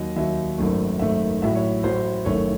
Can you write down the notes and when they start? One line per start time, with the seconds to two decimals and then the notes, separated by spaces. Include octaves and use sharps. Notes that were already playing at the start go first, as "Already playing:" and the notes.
Already playing: D#2 D#3 F#3 D#5
0.16 D#2 D#3 F#3 E5
0.58 G#1 F#2 D#3 A3
0.99 G#1 F#2 D#3 A3 E5
1.42 A1 A2 F#3 E5
1.55 C#5
1.83 A1 A2 F#3 C5
2.25 F#1 F#2 D#3 A3 C#5